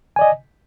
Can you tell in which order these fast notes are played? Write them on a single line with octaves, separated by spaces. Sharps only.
G#5 D5 D#5